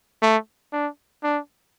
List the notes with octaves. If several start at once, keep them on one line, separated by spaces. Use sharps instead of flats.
A3
D4
D4